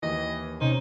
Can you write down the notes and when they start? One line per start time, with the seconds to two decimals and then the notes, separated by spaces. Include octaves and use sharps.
0.03 D#2 E3 D#5
0.61 C3 C#4 D#4 C5